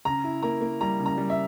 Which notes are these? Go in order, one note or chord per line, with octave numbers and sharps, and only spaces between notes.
C#3 A#5
E4
A#3 A#5
A#3
G3 A#5
C#3
A#5
G3
E5